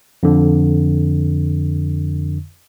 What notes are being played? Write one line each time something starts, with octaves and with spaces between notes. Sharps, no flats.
F2 D3